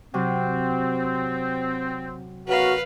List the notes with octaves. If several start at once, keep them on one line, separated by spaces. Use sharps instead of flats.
C3 F#3 C4
C#3 B3 F#4 A#4 B4 F5